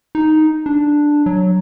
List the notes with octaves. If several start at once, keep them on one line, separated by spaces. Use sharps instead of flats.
D#4
D4
F#3